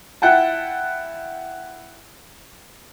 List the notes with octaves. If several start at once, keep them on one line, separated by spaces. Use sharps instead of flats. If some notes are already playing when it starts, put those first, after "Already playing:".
E4 F#5 G5 A5